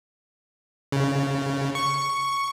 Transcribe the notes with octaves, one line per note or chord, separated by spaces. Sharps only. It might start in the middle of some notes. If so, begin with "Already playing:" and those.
C#3
C#6